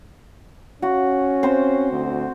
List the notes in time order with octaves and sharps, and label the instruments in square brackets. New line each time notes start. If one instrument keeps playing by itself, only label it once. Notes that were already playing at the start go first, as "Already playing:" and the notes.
[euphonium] C#4 [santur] F#4
[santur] C4 C5
[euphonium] D2